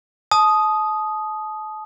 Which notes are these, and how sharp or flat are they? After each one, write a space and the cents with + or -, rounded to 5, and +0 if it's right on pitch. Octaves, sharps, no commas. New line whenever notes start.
A5 -35 D#6 +0